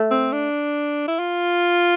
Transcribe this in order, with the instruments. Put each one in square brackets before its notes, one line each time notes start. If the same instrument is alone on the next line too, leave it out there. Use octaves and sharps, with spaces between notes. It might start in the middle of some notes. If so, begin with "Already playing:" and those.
Already playing: [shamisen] A3
[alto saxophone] C4
D4
E4
F4